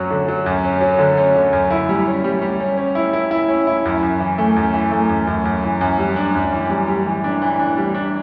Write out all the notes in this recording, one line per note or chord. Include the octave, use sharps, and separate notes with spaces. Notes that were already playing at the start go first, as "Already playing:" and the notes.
Already playing: F#2 F#3 C#4
D3
F#3
F#2
C#4
F#3
D3
C#4
D3
F#2
E4
G3
C#4
G3
G3
C#4
C#4
E4
E4
E4
C#4
E4
F#2
F#2
E3
A3
F#2
E3
A3
F#2
F#2
F#2
E3
F#2
G3
D4
F#2
E3
G3
G3
E3
D4
E3
D4
G3
D4